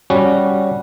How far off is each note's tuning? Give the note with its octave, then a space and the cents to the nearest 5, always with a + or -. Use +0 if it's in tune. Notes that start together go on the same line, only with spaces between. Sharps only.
G3 +0 C#4 +0 F#4 +0